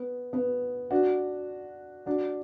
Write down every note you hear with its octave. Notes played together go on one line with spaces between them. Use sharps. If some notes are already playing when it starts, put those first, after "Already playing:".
Already playing: B3
B3
D4 F#4
D4 F#4